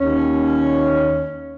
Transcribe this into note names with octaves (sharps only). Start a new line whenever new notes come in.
D#2 C#4